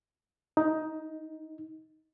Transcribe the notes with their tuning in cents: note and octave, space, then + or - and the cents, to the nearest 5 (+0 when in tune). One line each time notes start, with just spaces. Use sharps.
D#4 +10